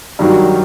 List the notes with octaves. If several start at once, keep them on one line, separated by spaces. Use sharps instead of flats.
G2 D#3 F#3